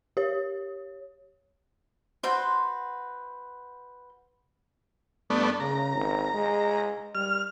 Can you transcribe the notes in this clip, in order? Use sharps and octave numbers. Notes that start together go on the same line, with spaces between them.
G4 C#5
F#4 B4 C5 C6
G2 A3 B3 D4
C#3 A#5
G#1
G#3
G3 F6